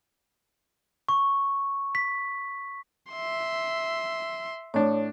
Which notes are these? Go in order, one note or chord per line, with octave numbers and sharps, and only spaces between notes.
C#6
B6
E5 C6
A2 D4 C#5